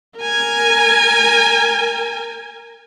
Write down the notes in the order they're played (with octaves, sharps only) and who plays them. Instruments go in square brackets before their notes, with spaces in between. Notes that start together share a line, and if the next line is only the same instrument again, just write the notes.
[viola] A#4 G#5